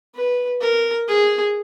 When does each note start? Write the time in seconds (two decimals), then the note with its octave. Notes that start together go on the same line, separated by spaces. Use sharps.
0.15 B4
0.60 A#4
1.08 G#4